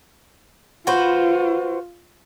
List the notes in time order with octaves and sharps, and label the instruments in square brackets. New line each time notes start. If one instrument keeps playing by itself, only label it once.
[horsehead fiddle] F4 [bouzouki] F#4 B4 C5